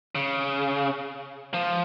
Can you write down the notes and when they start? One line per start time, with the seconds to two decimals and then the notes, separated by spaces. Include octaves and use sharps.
0.15 C#3
1.54 F3